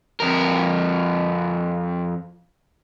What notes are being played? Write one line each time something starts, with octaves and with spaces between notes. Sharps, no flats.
F2 A#4